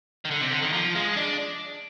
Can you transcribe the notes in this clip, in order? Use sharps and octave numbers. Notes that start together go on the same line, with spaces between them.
D#3
D3
C3
D3
D#3
F3
G#3
D4